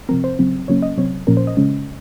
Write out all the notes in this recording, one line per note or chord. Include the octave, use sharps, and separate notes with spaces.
C3 F3 C4 A#4
C5
C#3 F#3 C4
C#3 F#3 A#3 C#4 C#5
D#5
C3 F#3 C4 C#5
A#2 F3 A#3 C#4 A#4
C5
D#5
C#3 G#3 C#4